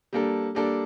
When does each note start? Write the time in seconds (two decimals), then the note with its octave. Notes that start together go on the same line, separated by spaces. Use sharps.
0.13 G3 A#3 D4 A4
0.55 G3 A#3 D4 A4